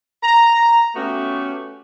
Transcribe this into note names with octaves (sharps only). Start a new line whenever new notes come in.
A#5
A3 B3 C#4 F#4 G4